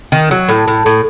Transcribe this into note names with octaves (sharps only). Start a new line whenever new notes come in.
D#3
F#3
A2
A2
A2